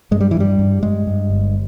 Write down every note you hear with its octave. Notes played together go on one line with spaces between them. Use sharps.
G2 G#3
G3
E3
G2 G3
G2
G2 G#3
G2
G1